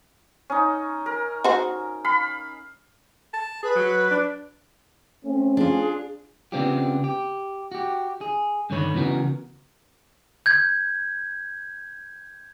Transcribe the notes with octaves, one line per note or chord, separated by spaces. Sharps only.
C#4 D#4
A#4
F#4 C5
F5 B5
A5
G#4 B4
F#3
D4
A3 C4 C#4
D4 F4 G#4
C#3 B3 C4 D4 F4 G4
G4
F#4 G4
G#4
G2 D3 D#3 C#5 B5
C#3 E3 B3 F#4 A#4
G6 G#6